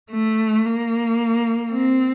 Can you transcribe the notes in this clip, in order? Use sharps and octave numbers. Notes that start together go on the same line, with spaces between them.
A3
A#3
C4